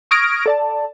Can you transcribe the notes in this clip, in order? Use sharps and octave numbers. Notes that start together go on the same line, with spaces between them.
C#6 D#6 F6 G#6 A#6 D7
A4 D5 A5